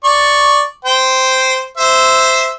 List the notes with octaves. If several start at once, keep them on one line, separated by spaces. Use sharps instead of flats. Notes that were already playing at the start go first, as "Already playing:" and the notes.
D5 C#6
C5 G5
C5 E5